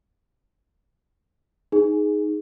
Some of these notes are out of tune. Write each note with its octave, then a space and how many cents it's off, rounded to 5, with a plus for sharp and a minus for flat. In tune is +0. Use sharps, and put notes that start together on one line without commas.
D#4 +0 G#4 +0